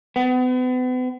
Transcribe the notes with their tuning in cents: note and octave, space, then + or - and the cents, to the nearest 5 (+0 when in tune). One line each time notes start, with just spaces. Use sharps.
B3 +40